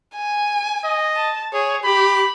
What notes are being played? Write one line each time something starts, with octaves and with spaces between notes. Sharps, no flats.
G#5
D#5
A5
G#4 C#5
G4 B5